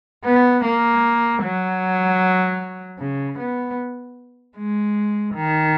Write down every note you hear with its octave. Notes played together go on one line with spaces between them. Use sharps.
B3
A#3
F#3
C#3
B3
G#3
D#3